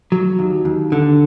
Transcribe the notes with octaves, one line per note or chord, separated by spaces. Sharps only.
F#3
D#2
D#2
D3